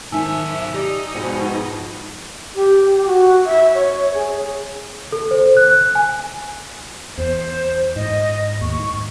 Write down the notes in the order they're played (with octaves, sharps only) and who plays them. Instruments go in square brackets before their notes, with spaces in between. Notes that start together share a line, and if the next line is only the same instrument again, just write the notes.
[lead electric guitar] B1 E5 [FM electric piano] G#2 D#3 C5 [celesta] G#5 A5 E6
[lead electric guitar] D#4 [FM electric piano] G4 D5
[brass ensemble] G#2 B2 [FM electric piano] F3 G5
[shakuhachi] G4
F#4
E5
C#5
G#4
[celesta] A4
C5
F#6
G#5
[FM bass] E2 [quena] C5
[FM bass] G#2 [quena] D#5
[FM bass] D#2 [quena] C#6
[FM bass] G#2